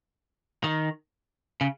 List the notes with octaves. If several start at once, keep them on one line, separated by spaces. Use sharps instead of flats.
D#3
C#3